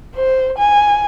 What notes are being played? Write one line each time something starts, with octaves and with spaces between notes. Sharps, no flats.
C5
G#5